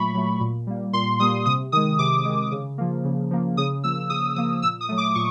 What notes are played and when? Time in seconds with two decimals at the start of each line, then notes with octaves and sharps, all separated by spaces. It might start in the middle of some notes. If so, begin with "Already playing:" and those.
Already playing: A#2 F#3 A3 B5 C#6
0.14 F#3 A3
0.40 A#2
0.67 G3 A#3
0.93 A#2 C6
1.20 G3 A#3 D#6
1.46 C3 D#6
1.72 D#3 G#3 D#6
1.99 C3 D6
2.25 D#3 G#3
2.52 C#3
2.78 F3 A#3
3.04 C#3
3.31 F3 A#3
3.57 C#3 D#6
3.84 F3 A#3 E6
4.10 C#3 D#6
4.36 F3 A#3 D#6
4.62 A#2 E6
4.81 D#6
4.89 F#3 A3
4.98 D6
5.15 A#2 C#6